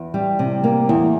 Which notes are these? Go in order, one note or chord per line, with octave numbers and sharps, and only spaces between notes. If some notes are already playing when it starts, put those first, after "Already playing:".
Already playing: E2
G3
C3
A#3
E2